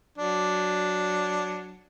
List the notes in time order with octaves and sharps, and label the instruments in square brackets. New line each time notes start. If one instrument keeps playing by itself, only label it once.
[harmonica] F#3 D4